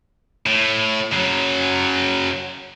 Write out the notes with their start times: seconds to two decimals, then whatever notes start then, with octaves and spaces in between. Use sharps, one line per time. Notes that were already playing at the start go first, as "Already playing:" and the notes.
0.46 A2
1.13 C#3 F#3